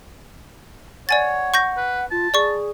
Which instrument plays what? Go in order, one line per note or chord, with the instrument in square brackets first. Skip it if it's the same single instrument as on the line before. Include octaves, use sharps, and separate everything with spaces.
[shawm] C#5 [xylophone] D5 G#5 A6 [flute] F#5
[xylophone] C#6 G6 A#6
[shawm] B4
[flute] F4 [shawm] A5
[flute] G#4 [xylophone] D5 C#6